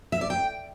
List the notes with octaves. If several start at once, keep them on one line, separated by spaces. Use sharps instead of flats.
E5
D5
G5